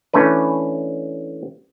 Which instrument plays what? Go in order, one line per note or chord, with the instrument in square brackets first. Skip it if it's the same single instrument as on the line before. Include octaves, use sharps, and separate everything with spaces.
[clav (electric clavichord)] E3 A3 C#4 D4 B4